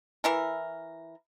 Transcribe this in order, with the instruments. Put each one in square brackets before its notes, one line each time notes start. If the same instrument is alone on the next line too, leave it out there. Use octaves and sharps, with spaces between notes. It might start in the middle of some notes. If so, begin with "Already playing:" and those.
[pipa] E3 E4 A#4